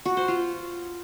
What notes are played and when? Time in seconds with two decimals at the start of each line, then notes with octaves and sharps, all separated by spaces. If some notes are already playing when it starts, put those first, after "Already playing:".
0.05 F#4
0.17 C5
0.28 F4